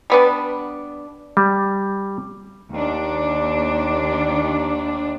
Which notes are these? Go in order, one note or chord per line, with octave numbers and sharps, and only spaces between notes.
G3 B3 D4
G3
D#2 D4